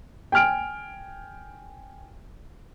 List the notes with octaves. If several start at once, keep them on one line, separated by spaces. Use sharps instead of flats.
G5 G#5 F6 D7